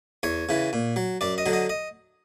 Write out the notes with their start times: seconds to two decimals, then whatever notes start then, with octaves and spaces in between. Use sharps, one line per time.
0.23 E2 C#5
0.49 C#3 E3
0.73 A#2
0.96 F#3
1.21 F#2 D5
1.38 D#5
1.46 D3 F#3
1.53 D#5
1.69 D#5